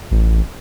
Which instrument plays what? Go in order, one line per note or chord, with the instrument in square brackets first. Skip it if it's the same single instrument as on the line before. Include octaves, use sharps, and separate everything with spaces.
[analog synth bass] A1